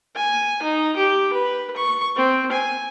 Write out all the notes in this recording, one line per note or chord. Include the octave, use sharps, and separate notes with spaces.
G#5
D#4
G4
B4
C#6
C4
G#5